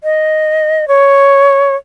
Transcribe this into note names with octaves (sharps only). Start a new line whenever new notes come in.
D#5
C#5